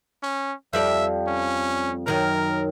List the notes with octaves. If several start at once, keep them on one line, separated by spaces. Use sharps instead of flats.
C#4
F2 G3 D5 E5
C#4
F#2 D#3 F#3 A#4